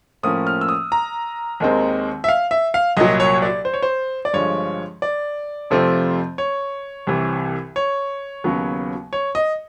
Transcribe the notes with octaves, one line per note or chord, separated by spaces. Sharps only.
A2 F3 A#3 C#4 D#6
F6
E6
D#6
A#5
D#2 D#3 G#3 C4
E5
F5
E5
F5
C2 A#2 F#3 D#5
C#5
D5
C5
C#5
C5
D5
G2 D3 F3 G#3 C#5
D5
F2 C3 F3 A3 C4
C#5
C2 C3 E3
C#5
D#2 C#3 F#3 B3
C#5
D#5